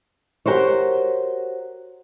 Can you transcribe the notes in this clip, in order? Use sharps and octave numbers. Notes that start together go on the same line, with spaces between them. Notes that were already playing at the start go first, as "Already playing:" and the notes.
F#4 G4 A#4 C5 C#5